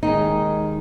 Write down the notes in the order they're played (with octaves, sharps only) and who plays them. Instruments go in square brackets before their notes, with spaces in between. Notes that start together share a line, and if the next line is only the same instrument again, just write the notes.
[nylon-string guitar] D#2 D#3 G#3 D#4